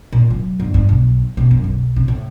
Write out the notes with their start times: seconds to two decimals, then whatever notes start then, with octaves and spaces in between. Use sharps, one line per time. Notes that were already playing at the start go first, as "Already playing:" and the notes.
0.12 A#2
0.30 F#3
0.60 G1
0.74 G2
0.89 B1
1.37 B2
1.51 F#2
1.64 B1
1.96 C3
2.08 A2